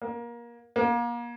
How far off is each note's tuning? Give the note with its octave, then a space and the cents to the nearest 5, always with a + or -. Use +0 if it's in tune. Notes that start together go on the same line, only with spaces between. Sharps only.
A#3 +25
A#3 +35